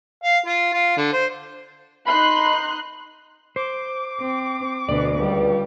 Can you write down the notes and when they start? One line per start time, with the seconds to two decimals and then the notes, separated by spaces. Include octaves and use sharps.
0.23 F5
0.46 F4
0.73 F4
0.97 D3
1.13 C5
2.07 D#4 B5 C6 F#6
3.56 C5 D6
4.20 C4
4.89 D2 B2 D5
5.20 C#2 G3